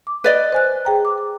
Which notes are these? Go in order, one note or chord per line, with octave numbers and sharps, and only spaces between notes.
D6
B4 D5 D#5
C5 G#5 F#6
G#4 G5 A#5
D6